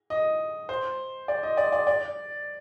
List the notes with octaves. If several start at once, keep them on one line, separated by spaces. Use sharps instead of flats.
D#5
C5
D5
D#5
D5
D5
D5